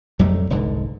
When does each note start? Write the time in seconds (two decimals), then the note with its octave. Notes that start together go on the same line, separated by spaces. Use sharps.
0.19 F2 F#3 G3 A3
0.50 F1 C2 G#2 D3